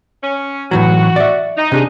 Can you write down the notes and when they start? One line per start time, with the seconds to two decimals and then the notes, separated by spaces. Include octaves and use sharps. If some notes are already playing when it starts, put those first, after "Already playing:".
0.23 C#4
0.71 A2 E3 F#3 F#4
1.16 D5 E5
1.57 D#4
1.72 C3 D4 G#4